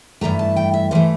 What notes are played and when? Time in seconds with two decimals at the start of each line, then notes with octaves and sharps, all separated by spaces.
0.21 G2 E3 A3 A#5
0.39 A5
0.56 G5
0.74 E5
0.91 G2 E3 A3 C5